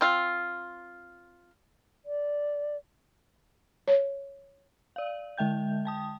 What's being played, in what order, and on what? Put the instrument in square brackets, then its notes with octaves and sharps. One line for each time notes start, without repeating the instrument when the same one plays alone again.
[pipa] C4 F4
[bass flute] D5
[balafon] C#5
[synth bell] D5 F5
D3 G#3 E5 G5 G6
G5 A5 D#6